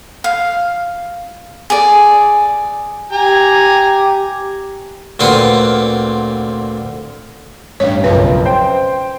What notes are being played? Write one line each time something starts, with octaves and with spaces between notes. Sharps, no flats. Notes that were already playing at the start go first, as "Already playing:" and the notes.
F5
G#4 D5
G4 G#5 A#5
D2 A#2 C4 B4 C5 F#5
A1 G2 C#5
F#1 B1 F2 B4
C5 G5